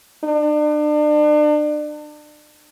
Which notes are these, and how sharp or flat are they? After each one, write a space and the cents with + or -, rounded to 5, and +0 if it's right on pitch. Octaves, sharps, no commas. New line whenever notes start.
D4 +35